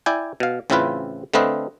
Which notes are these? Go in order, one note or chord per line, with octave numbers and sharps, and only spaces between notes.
E4 D5 G5 G#5
B2 F5
A1 C#3 C4 E4 F4 B4
D3 A3 C4 B4 D#5 F5